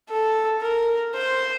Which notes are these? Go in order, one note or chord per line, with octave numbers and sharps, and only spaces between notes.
A4
A#4
C5